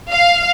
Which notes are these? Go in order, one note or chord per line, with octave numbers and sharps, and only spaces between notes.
F5